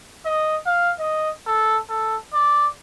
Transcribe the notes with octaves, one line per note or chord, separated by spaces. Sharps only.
D#5
F5
D#5
A4
A4
D5